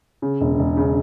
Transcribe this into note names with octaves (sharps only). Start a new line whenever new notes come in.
C#3
E1
E1
C#3